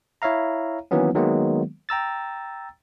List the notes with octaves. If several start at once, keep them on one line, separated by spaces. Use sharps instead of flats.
E4 C#5 E5 F5 A#5
D#3 E3 F#3 A#3 B3 C#4
D#3 F#3 G#3 A#3 B3
G5 A#5 E6 A6